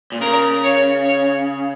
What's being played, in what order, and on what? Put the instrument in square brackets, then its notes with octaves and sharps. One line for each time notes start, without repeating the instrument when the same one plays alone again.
[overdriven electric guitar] A#2
[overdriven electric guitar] C#3 [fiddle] A#4
[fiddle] C#5
C#5